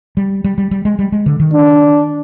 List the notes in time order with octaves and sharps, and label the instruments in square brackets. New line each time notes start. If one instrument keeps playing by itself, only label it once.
[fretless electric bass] G3
G3
G3
G3
G#3
G3
G#3
D3
D#3
[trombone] D4